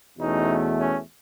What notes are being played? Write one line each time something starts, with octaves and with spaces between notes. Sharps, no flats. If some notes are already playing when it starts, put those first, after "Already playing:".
E2 B2 A3 C#4 D#4
C#4